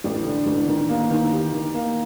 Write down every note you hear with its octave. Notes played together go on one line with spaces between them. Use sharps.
A1
D3
A1
D#3
A#3
D#3
G4
D#3
A#3